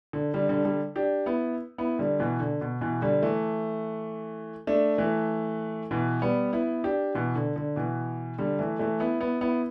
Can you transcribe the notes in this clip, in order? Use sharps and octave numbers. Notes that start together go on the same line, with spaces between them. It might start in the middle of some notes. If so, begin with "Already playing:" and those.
D3
D3 G3
D3 G3
D3 G3
D4 G4
B3 E4
B3 E4
D3 G3
B2 E3
D3
B2
B2 E3
D3 G3
E3 A3
A3 D4
E3 A3
B2 E3
G3 B3
B3 E4
D4 G4
B2 E3
D3
D3
B2 E3
D3 G3
E3 A3
E3 A3
B3 E4
B3 E4
B3 E4